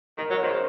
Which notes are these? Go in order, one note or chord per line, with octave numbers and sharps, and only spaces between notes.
D#3 A#4
F#3 C#5
D#3 C5
C#3